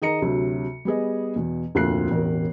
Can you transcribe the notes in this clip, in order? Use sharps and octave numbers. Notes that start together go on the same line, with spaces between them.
D#3 G#4 D#5 A#5 C#7
D2 C3 F#3
G3 B3 G#4 D#5
E2 B2
F1 D2 A#2 F4 F#6 C7
E1 A1 A#4